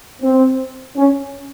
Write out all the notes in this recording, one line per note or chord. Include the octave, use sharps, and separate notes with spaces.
C4
C#4